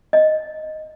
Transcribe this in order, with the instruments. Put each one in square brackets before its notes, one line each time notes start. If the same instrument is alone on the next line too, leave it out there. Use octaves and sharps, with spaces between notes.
[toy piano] D#5